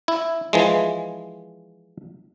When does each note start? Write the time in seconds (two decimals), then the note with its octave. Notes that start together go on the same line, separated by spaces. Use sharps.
0.08 E4
0.53 E3 F3 G#3